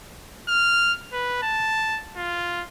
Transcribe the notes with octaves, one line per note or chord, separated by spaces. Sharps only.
F6
B4
A5
F4